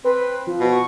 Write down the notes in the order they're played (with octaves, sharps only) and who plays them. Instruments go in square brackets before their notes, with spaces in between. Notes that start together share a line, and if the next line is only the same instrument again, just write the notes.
[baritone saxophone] C4 [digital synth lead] B4
[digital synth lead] F3
[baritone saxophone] B2
[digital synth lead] C#6